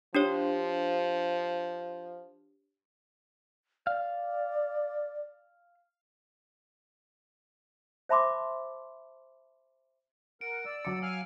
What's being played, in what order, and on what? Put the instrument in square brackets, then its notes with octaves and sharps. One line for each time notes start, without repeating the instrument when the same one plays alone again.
[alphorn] F3 [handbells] D4 G4 C#5
[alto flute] D5 [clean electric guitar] F5
[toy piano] C5 E5 A5 B5 C6 D6
[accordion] A#4 F#5 [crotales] D7
[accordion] D5 E6
[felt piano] F#3 D6 [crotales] C#7
[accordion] F5 G#5 F6 [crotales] E6